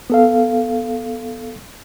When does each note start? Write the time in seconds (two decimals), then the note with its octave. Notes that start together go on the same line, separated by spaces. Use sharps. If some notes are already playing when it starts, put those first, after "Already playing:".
0.10 B3 A4 F5